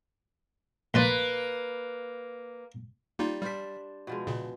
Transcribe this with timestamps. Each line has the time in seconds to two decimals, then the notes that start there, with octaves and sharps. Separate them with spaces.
0.94 A#1 A#3 F4 B4 D5
3.19 G3 A#3 D#4 F4
3.42 G3 D4 C5 F5 B6
4.07 B2 F3 G#3
4.27 A#2 C#3